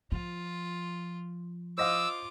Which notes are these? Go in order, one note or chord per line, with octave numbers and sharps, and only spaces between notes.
F3 F4
F4 C5 D#5 F5 D6 E6